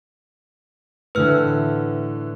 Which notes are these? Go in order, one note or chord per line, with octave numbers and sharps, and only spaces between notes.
A2 D3 E3 B4 F6